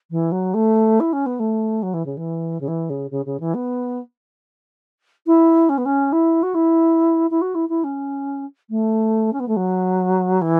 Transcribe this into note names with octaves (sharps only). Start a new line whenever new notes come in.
E3
F#3
A3
E4
C#4
B3
A3
F#3
E3
C#3
E3
C#3
E3
C#3
C#3
C#3
E3
B3
E4
C#4
B3
C#4
E4
F#4
E4
E4
F#4
E4
E4
C#4
A3
C#4
B3
A3
F#3
E3